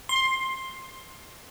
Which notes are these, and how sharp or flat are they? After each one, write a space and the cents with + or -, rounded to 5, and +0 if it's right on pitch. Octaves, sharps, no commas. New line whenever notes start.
C6 +15